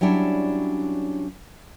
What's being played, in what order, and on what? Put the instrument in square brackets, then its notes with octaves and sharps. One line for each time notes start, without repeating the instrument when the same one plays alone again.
[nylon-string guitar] F#3 G3 C#4 D4 E4